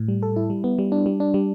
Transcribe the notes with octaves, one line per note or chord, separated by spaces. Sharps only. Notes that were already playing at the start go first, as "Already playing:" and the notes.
Already playing: A2
G3
A4
E4
G3
B3
G3
D4
G3
D4
G3